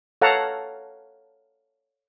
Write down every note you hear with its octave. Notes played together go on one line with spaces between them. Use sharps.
A4 C#5 F5 F#5 A5 A#5